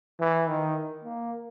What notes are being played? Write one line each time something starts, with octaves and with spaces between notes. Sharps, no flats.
E3
D#3
A#3